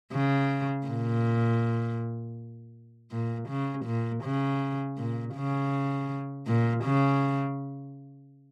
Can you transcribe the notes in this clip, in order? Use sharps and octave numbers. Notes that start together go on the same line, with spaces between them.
C#3
A#2
A#2
C#3
A#2
C#3
A#2
C#3
A#2
C#3